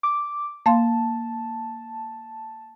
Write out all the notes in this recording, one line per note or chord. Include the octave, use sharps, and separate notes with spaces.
D6
A#3 F5 A5 C6